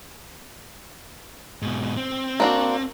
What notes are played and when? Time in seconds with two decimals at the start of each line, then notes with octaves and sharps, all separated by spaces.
1.62 G#2 B2
1.97 C4
2.40 A#3 D4 F#4